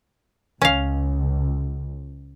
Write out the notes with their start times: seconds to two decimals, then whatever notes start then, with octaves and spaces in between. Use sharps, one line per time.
0.62 C#2 C#4 F5